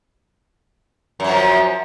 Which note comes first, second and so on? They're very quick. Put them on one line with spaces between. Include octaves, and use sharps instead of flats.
F#2 F#3 F3